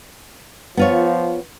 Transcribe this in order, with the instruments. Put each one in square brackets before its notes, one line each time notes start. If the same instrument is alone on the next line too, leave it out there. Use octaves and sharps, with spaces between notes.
[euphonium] F3 [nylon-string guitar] B3 F4 C#5